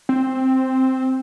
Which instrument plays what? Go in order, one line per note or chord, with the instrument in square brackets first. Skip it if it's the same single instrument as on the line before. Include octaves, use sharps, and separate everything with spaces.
[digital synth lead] C4